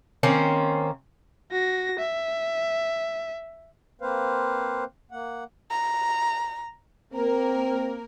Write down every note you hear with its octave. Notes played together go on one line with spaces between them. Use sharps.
D#3 A#3 C4 C#4
F#4 A#6
E5
A#3 C4 B4 C5 F5
A#3 F#5
A#5
A#3 C4 A#4